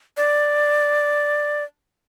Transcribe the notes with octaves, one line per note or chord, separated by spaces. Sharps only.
D5